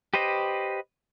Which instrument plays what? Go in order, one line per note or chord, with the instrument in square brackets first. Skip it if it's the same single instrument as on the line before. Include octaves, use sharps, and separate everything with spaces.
[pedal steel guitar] G4 B4 C5 D#5